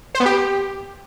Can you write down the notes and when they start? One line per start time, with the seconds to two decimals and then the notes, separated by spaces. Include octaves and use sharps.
0.15 C5
0.20 B3
0.25 G4